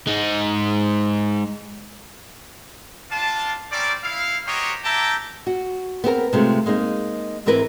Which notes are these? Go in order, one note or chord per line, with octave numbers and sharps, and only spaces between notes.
G#3 D#4
D4 F4 A5
G3 C4 C#4 A#4 D5
E4 F5
F#4 G4 A#4 C5 C#5 D#5
E4 G4 E5 G5 A5 A#5
F#4
B3 C4 G4 A#4
C3 G#3 A3 F4
G#3 A#3 C4 D#4
G#2 E3 C4 E4 A#4 B4